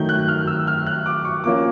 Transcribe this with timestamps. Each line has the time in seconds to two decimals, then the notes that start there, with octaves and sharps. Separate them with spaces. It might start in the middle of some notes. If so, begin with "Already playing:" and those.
Already playing: D#3 F#3 A3 G6
0.09 F#6
0.28 F6
0.47 E6
0.67 F6
0.86 F#6
1.06 D6
1.25 C#6
1.44 F3 A#3 C#4 F4 D6